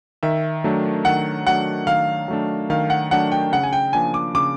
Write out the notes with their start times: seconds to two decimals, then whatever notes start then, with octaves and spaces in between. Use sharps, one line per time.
0.23 D#3 E5
0.64 F#3 A3 D4
1.05 D#3 F#5
1.46 F#3 A3 D4 F#5
1.87 D#3 F5
2.28 F#3 A3 D4
2.70 D#3 F5
2.90 F#5
3.11 F#3 A3 D4 F#5
3.32 G5
3.52 C#3 F#5
3.63 G#5
3.73 G5
3.93 F3 A#3 D4 G#5
4.14 D6
4.35 C#3 D6